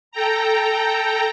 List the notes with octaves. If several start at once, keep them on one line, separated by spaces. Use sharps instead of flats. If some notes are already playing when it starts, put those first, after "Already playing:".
A4 G5 A#5